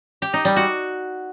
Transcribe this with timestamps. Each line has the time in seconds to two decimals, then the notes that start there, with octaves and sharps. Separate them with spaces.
0.22 G4
0.33 D#4
0.45 G3
0.56 F#4